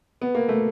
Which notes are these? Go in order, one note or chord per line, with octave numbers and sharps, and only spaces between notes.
B3
A#3
A3